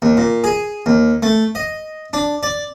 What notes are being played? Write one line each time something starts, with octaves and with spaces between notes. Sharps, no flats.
D#2
A#2
G#4
D#2
A3
D#5
D4
D5